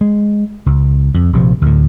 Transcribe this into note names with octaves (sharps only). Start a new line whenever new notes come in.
G#3
C#2
F2
A#1 C3 F3
D2 A2